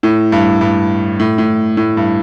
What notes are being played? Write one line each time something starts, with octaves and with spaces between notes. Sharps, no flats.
A2
G2
G2
A2
A2
A2
G2